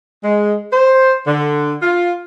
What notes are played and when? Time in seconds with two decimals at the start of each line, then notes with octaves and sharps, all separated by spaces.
0.24 G#3
0.72 C5
1.27 D3
1.82 F4